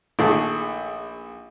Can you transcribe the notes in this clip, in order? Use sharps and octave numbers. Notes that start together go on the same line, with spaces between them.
A#1 D#3 A3 G#4 A4